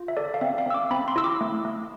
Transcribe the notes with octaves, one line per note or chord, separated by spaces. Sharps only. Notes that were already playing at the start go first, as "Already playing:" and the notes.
Already playing: F4
E5
A4 D5
F5
C4 E5
F5
C4 E6
D6
C4 B5
C6
E4 E6
D6
A3
A3